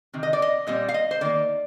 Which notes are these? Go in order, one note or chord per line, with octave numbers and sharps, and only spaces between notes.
C3 D#3
D#5
D5
D#5
A#2 G3 C4 D#5
F5
D#5
C5
D#3 A#3 D5